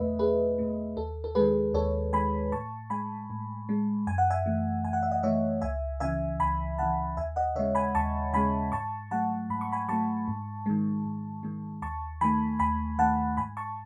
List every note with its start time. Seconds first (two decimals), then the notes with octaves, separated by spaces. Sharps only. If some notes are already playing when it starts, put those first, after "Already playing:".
Already playing: E2 B2 A3 B4 D#5 E5
0.19 E2 G#4 B4
0.58 B2 A3
0.96 D#2 A4
1.24 A4
1.35 D#3 G#3 G#4 B4
1.74 D#2 A4 C#5
2.13 D#3 G#3 G#5 B5
2.52 A2 A5 C#6
2.90 G#3 G#5 B5
3.30 A2
3.69 G#3
4.07 F#2 G#5
4.18 F#5
4.30 E5 G#5
4.46 E3 A3
4.84 F#2 G#5
4.93 F#5
5.03 E5
5.11 D#5 F#5
5.23 E3 A3 C#5 E5
5.61 C#2 E5 G#5
6.00 C#3 E3 E5 G#5
6.39 C#2 G#5 B5
6.78 C#3 E3 F#5 A5
7.17 D#2 E5 G#5
7.36 D#5 F#5
7.55 C#3 C#5 E5
7.59 G#3
7.75 G#5 B5
7.95 D#2 A5 C#6
8.33 C#3 G#3 G#5 B5
8.72 G#2 A5 C#6
9.11 F#3 A3 F#5 A5
9.50 G#2 B5
9.61 C#6
9.72 G#5 B5
9.88 F#3 A3 A5 C#6
10.28 G#2
10.66 D#3 G#3
11.05 G#2
11.43 D#3 G#3
11.82 D#2 A5 C#6
12.21 D#3 A3 G#5 B5
12.59 D#2 G#5 B5
12.98 D#3 A3 F#5 A5
13.37 G#2 G#5 B5
13.57 A5 C#6